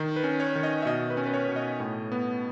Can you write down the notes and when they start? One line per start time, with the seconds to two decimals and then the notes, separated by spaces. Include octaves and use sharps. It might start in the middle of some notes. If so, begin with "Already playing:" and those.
Already playing: D#3
0.16 B4
0.24 C#4
0.40 C#5
0.56 D#3
0.63 D#5
0.82 E5
0.86 B2 D#5
1.10 B4
1.17 C#4
1.26 B4
1.34 C#5
1.49 B2
1.56 D#5
1.80 A2
2.12 B3